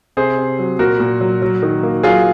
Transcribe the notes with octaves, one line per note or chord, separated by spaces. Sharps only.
C3 G#4 C5
C3
F#3
A#2 F#4 A#4
A#2
F#3
F#3
D#3
A#3
F#3 F4 G#4